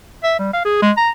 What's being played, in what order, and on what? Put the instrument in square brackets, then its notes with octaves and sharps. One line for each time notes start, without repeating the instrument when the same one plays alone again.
[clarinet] E5
G3
F5
G#4
G#3
A#5